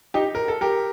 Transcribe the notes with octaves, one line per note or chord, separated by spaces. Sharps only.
D#4 G4
A#4
A4
G4 A#4